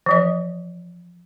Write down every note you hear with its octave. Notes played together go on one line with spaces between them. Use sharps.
E3 F3 D#5